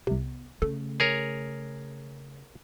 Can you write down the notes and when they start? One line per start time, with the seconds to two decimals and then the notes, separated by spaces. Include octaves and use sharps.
0.07 C2 C3 B3
0.62 C#3 A3 A4
1.00 G#4 A#4 C#5